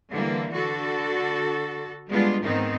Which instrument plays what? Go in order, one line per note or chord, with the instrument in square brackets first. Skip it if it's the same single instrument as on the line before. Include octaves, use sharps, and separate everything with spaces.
[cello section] D3 E3 G3 A#3
D3 F#4 A4
G3 G#3 B3 D4 F4
G#2 D#3 B3 C4 D#4